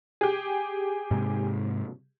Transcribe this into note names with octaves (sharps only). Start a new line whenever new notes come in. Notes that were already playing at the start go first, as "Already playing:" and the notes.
G4 G#4
G#2 C3 G#3